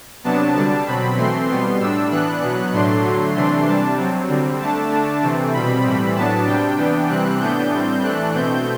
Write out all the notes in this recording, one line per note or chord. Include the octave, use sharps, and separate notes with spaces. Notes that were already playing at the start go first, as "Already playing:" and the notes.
C3 F#3 B3 D4 A5
D3 G3 D4 A5
B2 F#3 C4 B5
E3 A3 C4 C6
B2 G3 B3 C6
A2 G3 D4 E6
E3 B3 D4 F#6
B2 F#3 B3 F#6
A2 F#3 A3 D4 C6
D3 F#3 A3
C3 E3 A3 D4 C6
C3 G3 D4 A5
C3 F#3 C4
D3 G3 C4
D3 A3 D4 A5
D3 A3 D4
C3 E3 A3 C4
B2 G3 C4 B5
A2 E3 G3 C4
A2 F#3 B3 D4 A5
C3 G3 D4 G5
E3 B3 D4
C3 E3 G3 C4 F#6
A2 E3 B3 D4 G6
A2 G3 C4
E3 A3 D4 F#6
B2 A3 C4 G6